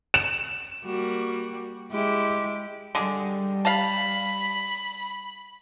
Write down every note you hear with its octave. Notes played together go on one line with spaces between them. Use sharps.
E7
G3 A#3 F#4
G#3 E4 G4
D3 G3 G#3
F5 A5 B5